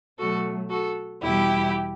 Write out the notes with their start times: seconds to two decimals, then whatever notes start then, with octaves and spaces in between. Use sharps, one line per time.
0.19 B2 F#3 A3 F#4 A4
0.70 F#4 A4
1.22 E2 B2 G3 B3 E4 G4